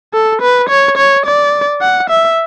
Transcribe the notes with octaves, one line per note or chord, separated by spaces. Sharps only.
A4
B4
C#5
C#5
D5
F#5
E5